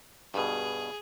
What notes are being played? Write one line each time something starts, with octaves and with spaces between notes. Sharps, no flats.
G2 B2 G#4